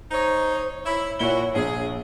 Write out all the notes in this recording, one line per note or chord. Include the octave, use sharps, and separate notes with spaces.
D#4 C5 C#5 D#5
E4 C#5
A#2 E4 F#4 G7
A#1 G#4